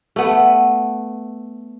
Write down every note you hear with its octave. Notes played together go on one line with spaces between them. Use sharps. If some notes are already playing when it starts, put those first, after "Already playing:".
A3 B3